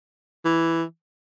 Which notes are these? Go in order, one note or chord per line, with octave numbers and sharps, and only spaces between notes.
E3